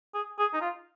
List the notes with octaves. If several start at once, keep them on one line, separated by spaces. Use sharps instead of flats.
G#4
G#4
D#4
F4